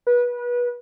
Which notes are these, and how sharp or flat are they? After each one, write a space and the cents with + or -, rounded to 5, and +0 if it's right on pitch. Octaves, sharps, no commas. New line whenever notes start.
B4 -25